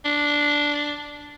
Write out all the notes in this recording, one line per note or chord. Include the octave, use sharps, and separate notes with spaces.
D4